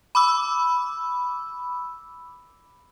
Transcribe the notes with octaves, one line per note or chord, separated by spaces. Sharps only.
B5 D6 E6